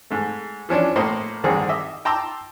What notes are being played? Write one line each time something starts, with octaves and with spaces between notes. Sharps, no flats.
G#2 A3
E3 F3 C#4 D4
A2 A#3 C5 D#5 C6
A1 G2 D3 D#3 C4 G#4
D#5 E5 D6
G5 A5 A#5 C6 D6 E6